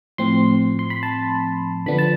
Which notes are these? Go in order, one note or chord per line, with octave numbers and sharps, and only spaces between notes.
A2 F3 C4 C6
C6
B5
A5
D3 F3 B3 D4 B5
A5